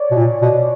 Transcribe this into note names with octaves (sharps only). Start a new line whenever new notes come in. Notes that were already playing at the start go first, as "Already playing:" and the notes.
Already playing: C#5 D5
B2
A#2
B2